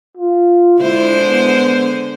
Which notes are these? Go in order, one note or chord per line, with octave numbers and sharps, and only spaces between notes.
F4
D3 G#3 E4 C5
B3